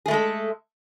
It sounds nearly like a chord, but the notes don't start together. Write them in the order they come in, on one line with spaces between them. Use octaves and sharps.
G#4 A3 G#3 A4